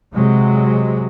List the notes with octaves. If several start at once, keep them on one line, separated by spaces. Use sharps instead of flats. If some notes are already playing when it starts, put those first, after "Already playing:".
C3 F#3 G#3